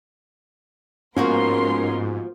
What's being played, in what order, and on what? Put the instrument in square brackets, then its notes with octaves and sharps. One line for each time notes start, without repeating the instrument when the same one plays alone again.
[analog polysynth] G#2 [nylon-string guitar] F3 A#3 F#4 [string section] B3 A#4 C6 [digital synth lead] C#4